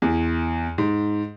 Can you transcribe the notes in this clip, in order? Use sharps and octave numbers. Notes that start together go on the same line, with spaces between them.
E2
G#2